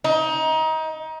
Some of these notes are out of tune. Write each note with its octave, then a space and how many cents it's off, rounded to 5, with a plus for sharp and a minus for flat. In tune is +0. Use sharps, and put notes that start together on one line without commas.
D#4 +25